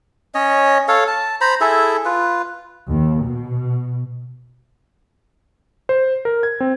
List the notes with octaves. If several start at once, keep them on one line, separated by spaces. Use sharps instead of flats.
C#4 C#5 D#5
A4 C#5 F5
A5
C5 A#5 B5
E4 G#4 A4 E5
F4 B4
D#2
B2
C5
A#4
G#6
C4